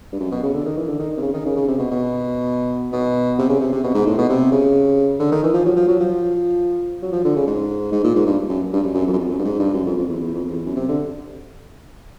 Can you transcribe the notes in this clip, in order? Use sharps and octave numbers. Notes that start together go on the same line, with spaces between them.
G2
F#2
B2
C#3
D3
D#3
E3
D3
D#3
C3
C#3
D#3
C#3
C#3
C3
B2
B2
B2
C3
C#3
C3
C3
B2
G#2
A2
B2
C3
C#3
D3
D#3
E3
F3
F#3
F3
F#3
F3
F#3
F3
D3
C#3
G#2
G#2
A#2
G#2
G2
F#2
G2
F#2
F#2
F2
F#2
F2
F#2
G2
G#2
G2
F#2
F2
F2
E2
E2
F2
F2
E2
F#2
C3
D3